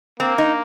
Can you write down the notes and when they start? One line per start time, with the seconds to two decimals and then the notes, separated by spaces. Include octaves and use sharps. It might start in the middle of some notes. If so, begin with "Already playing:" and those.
0.20 A#3 C4
0.38 D#4